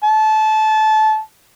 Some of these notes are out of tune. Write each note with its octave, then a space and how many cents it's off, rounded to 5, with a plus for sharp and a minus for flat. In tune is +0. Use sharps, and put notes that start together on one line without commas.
A5 -20